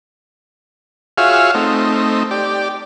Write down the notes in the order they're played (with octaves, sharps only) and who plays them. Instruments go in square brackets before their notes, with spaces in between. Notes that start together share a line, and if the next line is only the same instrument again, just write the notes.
[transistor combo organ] F4 F#4 G#4 C#5 E5 F5
A3 C4 D#4
G4 D5